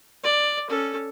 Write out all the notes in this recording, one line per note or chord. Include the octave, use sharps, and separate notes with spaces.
D5
C#4 A4